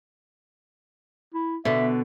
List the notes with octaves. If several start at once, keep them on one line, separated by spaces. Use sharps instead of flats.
E4
B2 D3 E5